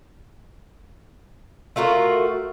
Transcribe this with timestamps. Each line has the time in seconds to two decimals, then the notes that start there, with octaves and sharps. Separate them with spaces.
1.76 A3 F4 F#4 A#4